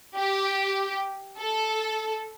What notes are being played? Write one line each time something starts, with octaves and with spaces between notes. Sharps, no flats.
G4
A4